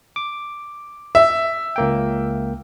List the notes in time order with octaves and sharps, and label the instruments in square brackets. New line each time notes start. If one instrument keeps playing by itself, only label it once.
[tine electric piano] D6
[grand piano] E5
[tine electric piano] C#2 A#3 G5